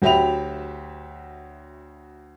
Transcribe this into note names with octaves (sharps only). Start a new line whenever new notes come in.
D2 F#3 G4 E5 B5 F7